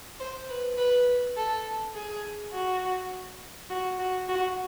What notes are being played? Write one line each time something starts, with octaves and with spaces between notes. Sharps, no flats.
C5
B4
B4
A4
G#4
F#4
F#4
F#4
F#4